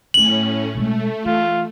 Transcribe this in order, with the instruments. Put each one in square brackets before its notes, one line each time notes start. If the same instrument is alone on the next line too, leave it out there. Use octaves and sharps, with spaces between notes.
[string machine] A2 C#4 [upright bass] F#3 A3 [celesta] F#7
[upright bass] B2 G#3 [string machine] A3
[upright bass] E3 [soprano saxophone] F4